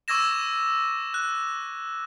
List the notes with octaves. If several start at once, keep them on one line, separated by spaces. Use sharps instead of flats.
C#6 D6 E6 G#6 A#6 E7
F#6